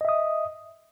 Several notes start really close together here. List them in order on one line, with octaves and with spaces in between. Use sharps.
D#5 E5 D#6